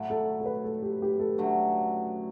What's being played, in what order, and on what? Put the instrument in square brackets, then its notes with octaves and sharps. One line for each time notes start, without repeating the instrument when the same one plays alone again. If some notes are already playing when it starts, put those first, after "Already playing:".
Already playing: [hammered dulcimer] A2 F#3 A3 E4
[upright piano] A4
A4
B4
A4
G4
G4
A4
[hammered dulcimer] F#2 D3 F#3 A3